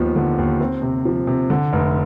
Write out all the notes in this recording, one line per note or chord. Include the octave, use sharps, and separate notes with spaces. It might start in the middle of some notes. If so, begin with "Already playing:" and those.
Already playing: D#2 F3 B3
D3
D#2
C4
C3
F3
C3
D3
F1